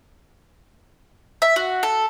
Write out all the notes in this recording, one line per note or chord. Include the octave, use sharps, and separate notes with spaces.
E5
F#4
A4